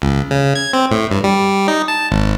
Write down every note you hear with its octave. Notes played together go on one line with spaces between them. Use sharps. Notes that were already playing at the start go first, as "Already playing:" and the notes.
C#2
C#3
G#6
C4
A2
G2
G3
D#4
A5
G#1